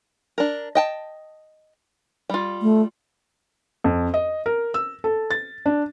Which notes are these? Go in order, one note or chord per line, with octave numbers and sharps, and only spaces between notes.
D4 A#4
D#5 G5 A5
G3 F4
A3
F2
D#5
A#4
E6
A4
A6
D4